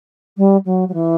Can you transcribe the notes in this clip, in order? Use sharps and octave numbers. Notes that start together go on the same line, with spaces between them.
G3
F#3
F#3
E3